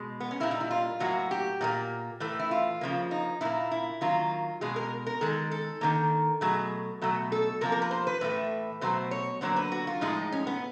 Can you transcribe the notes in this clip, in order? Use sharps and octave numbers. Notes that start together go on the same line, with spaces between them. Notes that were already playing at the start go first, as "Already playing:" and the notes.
Already playing: B2 G#3
B3
C#4
A#2 G3 A#3 E4
D#4
E4
F4
A2 F#3 A#3 F#4
G4
A#2 G3 A#3
A2 E3 A3
E4
F4
C#3 F3 A#3
D#4
A#2 G3 A#3 E4
E4
D#3 F#3 A#3 F4
B2 G#3 G#4
A#4
A#4
D#3 G#3 A4
A4
D#3 F#3 A#3
B2 F#3 A3 G#4
B2 F#3 A3
A4
C3 F3 A#3 A#4
A#4
B4
C5
B4
A2 E3 A3
B2 F#3 A3 C5
C#5
D3 F#3 A#3 C5
B4
F#4
F4
A2 F3 G#3 D#4
C#4
B3